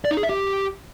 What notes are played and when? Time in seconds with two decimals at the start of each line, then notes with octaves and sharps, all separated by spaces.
0.05 D5
0.11 D#4
0.17 G#4
0.23 E5
0.29 G4